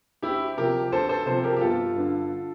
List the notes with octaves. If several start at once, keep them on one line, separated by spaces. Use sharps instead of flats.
D2 E4 G4
C3 F3 G4 A#4
D2 A4 C5
A4 C5
C3 F3 A4 C5
G4 A#4
G4
G1 F4 A4
G2 D3